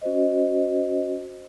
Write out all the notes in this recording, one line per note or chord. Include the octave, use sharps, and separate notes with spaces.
C#4 F#4 C5 D#5